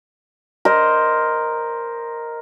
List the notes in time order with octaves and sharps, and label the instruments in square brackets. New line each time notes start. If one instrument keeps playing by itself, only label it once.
[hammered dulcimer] A#4 C5 D#5